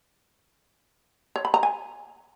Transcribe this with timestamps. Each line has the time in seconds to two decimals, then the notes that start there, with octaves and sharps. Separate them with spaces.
1.36 C#5
1.45 B5
1.54 A#5
1.63 G#5